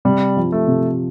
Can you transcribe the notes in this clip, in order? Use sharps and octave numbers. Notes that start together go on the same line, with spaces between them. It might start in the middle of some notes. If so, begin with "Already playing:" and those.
C3 G3
F3
A3
C3